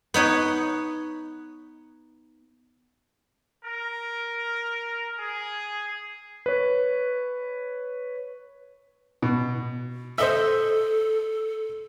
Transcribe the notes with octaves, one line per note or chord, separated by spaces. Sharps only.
B3 D#4 C#5 F#5
A#4
G#4
B4 C#5
B2
A4 C5 D#5 E5